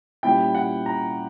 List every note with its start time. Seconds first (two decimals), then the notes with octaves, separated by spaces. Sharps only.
0.23 A#2 G3 C#4 E4 G5
0.55 F#5
0.86 A#5